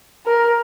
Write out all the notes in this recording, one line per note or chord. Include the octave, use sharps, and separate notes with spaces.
A#4